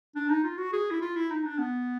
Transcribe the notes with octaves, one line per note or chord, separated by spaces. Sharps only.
D4
D#4
F4
F#4
G#4
E4
F4
E4
D#4
D4
B3